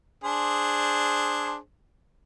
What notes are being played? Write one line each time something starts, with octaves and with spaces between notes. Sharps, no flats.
D4 G#4 C5